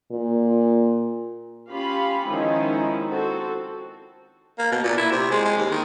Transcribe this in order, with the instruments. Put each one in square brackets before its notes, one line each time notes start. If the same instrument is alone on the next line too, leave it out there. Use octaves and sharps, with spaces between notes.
[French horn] A#2
[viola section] C#4 F4 G4 F5 B5
D#3 F3 G#3 C#4 D#4 E4
C4 F#4 A4
[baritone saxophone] A#3
B2
A#2
E4
C3
G#3
G#3
D#2
D#3